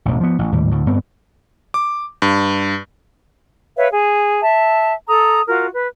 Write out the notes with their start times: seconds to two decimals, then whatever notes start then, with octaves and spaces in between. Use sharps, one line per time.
0.05 E1 A1
0.20 F3 B3
0.39 A1
0.52 G#1 D#2 A2 G3
0.71 D2 A2
0.86 G2 B3 C4
1.74 D6
2.22 G2
3.76 B4 C#5 E5 F5
3.91 G#4
4.41 E5 A5
5.08 A4 A#5 D#6
5.47 F4 F#4 A#4
5.74 B4